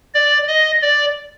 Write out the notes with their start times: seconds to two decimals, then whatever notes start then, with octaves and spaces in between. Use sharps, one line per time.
0.14 D5
0.47 D#5
0.82 D5